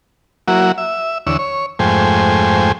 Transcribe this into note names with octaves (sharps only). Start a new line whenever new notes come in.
F#3 A#3 E4 F#4
E5
E2 D3 C#5 E6
C#5
F2 G#2 A3 C5 G5 G#5